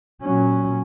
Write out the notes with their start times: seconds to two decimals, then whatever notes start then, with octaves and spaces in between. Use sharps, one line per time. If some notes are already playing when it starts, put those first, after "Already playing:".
0.22 A#2 F#3 C#4